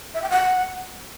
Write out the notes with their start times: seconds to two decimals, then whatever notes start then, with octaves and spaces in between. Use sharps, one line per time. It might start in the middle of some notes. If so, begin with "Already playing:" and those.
0.14 E5
0.22 G5
0.30 F#5